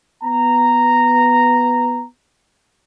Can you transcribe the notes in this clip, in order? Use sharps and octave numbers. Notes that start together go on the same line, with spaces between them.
B3 A#5